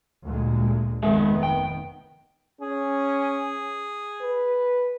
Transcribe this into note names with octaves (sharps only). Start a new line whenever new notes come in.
D2 A#2 G#3
F1 D#3 G#3 B3 G#4 E5
G5
C#4 G#4
B4